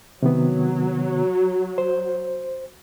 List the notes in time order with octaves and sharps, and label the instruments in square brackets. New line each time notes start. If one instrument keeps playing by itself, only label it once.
[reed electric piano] C3 D#3 B3 [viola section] F#3
[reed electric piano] C5